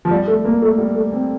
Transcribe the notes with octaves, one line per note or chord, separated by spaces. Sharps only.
F3
G3
A3
A#3
A3
G3
A3
C4